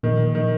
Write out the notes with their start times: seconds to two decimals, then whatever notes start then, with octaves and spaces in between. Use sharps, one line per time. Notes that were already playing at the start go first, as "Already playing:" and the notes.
0.03 A#2 D#3
0.35 D#3